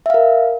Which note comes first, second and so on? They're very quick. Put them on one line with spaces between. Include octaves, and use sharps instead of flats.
E5 F5 A#4